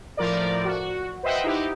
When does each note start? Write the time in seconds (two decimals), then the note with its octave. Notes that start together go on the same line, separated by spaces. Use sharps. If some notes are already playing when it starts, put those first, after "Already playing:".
0.17 A2 F3 A#4 D5
0.65 F#4
1.23 B4 C5 D#5 E5 F#5 G5
1.44 D#4 E4 G4